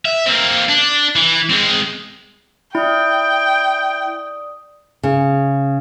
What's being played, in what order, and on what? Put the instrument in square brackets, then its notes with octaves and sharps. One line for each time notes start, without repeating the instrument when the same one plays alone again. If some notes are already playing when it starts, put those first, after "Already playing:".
[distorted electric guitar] E5
A#3 C4
D4
E3
G#3 C4
[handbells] E4 [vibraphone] D5 D#6 [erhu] G5
[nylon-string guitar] C#3